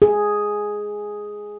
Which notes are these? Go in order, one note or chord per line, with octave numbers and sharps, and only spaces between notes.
G#4